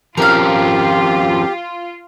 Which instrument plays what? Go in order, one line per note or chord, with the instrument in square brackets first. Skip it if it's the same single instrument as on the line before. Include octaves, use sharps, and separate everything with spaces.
[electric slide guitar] F3 C4 C#4 [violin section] F4 [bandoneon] G4 [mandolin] A#4 F5